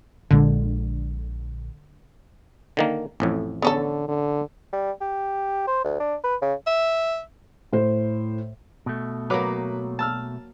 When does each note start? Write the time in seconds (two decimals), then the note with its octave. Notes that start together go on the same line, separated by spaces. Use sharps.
0.31 A#1 A#2 D3 G#3
2.77 D3 D#3 A#3
3.20 A1 F2 A2
3.62 D3 B3 C#4 A4
4.08 D3
4.73 G3
5.01 G4
5.67 C5
5.84 D2
6.00 D4
6.24 B4
6.42 C#3
6.67 E5
7.73 A2 C5
8.86 B2 A3
9.30 F#3 A#3 B4 F#5 D6
9.99 A5 E6 F6